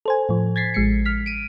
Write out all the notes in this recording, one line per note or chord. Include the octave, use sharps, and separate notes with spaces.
A4 C5 G#5
A2 F3
G#6 A6 B6 C7
A1 G#3 C7 C#7
F6 B6
D7 D#7